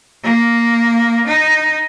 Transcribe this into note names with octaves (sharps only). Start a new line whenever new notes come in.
A#3
D#4